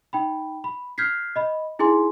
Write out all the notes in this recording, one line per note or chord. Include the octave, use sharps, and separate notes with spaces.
D#4 G5 B5
B5
F6 G6 G#6 B6 C7
D#5 B5
D#4 E4 G#4 G#5 C6